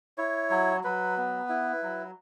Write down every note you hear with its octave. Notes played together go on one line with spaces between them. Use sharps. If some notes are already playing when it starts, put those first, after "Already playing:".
E4 C#5
F#3
F#3 B4
B3
E4
F#3